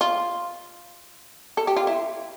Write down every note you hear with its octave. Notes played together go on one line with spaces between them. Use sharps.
F4
A4
G4
F4
E4